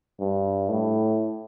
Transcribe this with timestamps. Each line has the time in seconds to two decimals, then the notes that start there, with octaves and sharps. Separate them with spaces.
0.20 G2
0.69 A2